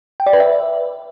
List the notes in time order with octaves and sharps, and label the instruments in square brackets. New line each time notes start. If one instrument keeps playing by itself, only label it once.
[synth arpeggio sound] G5
D5
B4
E5